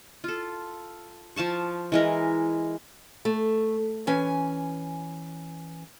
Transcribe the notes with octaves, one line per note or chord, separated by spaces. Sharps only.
F4 A4
F3 F5 A5 C#6
E3 G#3 A#4
A3
E3 C#4 G#5